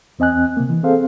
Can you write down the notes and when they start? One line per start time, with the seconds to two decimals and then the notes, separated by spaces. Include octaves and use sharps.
0.19 E2 C4 D#5 G#5 F#6
0.57 C3 A#3
0.69 E3
0.83 C4 G#4 A4 C5 F5